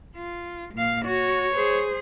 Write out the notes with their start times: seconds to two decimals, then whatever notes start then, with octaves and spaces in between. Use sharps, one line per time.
0.16 F4
0.74 A#2 F5
1.05 F#4 C#5
1.54 G#4 C5